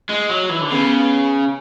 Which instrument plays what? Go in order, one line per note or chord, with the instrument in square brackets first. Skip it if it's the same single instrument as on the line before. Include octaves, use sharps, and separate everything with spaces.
[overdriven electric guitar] G#3
F#3
E3
D3
[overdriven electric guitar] C#3 [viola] B3